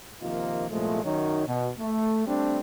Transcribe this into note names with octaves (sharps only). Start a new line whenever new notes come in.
C3 D#3 F3 A#3 D#4 F4
C2 A#2 F3 G#3 A3
F#2 D#3 F#3 C#4 D#4
B2
A3
G3 A3 C4 D4